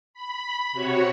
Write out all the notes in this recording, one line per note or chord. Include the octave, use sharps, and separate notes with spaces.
B5
C3 F#4 C#5 C#6